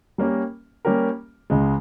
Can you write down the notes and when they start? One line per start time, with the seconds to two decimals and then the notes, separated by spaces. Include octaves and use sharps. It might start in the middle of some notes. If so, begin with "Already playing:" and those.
0.18 G3 A#3 C#4 G4 A#4
0.85 G3 A#3 C#4 G4 A#4
1.50 C#2 C#3 G#3